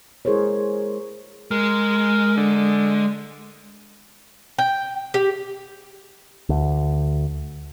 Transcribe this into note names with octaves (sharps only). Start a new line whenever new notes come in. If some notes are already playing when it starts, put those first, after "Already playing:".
G#3 E4 G#4 A#4 C5 C#5
G#3 A#4
D3
G5
G4
D2